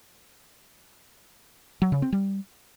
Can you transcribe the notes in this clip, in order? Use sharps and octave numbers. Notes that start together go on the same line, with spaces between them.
F#3
C#3
C4
G3